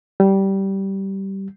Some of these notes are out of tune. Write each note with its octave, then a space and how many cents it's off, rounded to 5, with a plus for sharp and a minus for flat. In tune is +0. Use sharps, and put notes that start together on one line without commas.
G3 -15